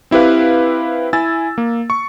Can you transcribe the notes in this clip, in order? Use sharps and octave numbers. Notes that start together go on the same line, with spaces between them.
C4 E4 G4 B4 F5
E4 G#5 E6 A6
A#3
C#6